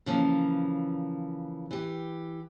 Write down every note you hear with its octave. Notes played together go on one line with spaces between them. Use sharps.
C#3 E3 F3 A#3
E3 G4